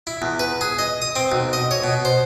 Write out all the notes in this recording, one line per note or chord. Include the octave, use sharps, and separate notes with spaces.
E4
E2
B4
G#4
D#5
D#6
C4
B1
D#5
C#5
B2
C5